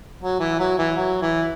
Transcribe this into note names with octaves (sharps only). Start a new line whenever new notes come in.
F#3
E3
F#3
E3
F#3
E3